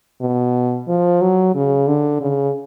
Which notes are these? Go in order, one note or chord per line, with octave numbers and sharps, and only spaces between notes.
B2
F3
F#3
C#3
D3
C#3